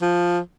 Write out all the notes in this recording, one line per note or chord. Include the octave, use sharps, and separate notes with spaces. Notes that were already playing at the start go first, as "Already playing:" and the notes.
F3